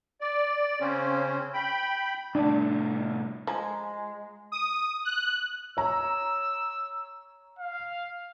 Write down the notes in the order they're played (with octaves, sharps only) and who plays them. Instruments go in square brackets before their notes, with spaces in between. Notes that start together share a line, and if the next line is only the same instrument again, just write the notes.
[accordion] D5
C#3 C4 C#4
G5 B5
[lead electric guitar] C2 A2 [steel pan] D4
[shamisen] F3 [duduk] G#3 [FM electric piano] G#5 A#5
[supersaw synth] D#6
F#6
[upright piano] C#5 A#5 [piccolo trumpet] E6
[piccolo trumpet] F5